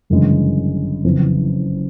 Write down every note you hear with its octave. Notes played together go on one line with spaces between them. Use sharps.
G1 F#2 C#3 E3 G#3
F#1 F2 C#3 E3